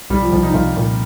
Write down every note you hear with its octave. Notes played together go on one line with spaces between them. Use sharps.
C2 G3
F3
C2 F3
D#4
C2 F4
A#2